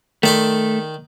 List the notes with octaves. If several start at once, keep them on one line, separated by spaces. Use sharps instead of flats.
D#3 A3 D5 C6